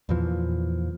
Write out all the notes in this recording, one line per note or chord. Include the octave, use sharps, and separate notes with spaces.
E2 A#2 E3 F3